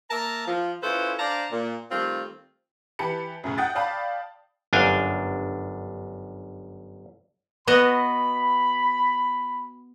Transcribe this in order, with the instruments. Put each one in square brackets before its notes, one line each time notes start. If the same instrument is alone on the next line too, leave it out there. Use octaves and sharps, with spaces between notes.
[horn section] A#3 A#4 E5 A5 A#5
F3
C#4 E4 F4 A4 B4 C5
D4 C5 D5 F5 A5 A#5
A#2
D#3 G3 A3 C4 F4
[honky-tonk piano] E3 G4 A5 B5 C#7
F#2 A2 C#3
F#5 G5 D#6 A6
D5 F5 G5 A5 B5
[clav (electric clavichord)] G1 F#2 D4 F5 G5 G#5
[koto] B3 F#4 D#5 [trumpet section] B5